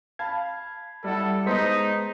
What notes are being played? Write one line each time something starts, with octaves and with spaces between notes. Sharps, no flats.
F5 A5 B5 G#6
G3 E4 A4 F#5
G#3 B3 D#4 C5 B6